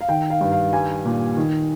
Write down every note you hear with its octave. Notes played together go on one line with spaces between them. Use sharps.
F5
D#3 G5
F5
G2
F5
G3 G#5
A#2
D#3